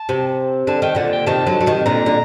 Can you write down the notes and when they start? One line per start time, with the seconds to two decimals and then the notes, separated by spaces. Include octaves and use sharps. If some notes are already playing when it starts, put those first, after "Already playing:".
Already playing: A5
0.09 C3
0.67 D3 A5
0.82 D#3 G5
0.95 A#2 D3 F#5
1.13 G5
1.26 C3 D#3 A5
1.46 D3 F#3
1.61 F#3
1.66 C3 D#3
1.86 A#2 D3 A#5
2.06 D3